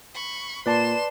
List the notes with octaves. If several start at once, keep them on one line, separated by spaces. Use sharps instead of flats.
B5 C#6
A#2 B4 D5 A5 C6 E7